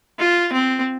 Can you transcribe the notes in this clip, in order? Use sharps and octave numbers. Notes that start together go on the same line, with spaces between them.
F4
C4